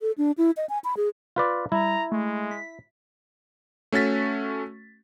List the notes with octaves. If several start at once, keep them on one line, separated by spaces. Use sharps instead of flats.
A4
D4
E4
D#5
G#5
B5
G#4
F4 B4 D5
G3 E4 A#5
G#3 A3
B6
A3 C#4 F#4 A6 B6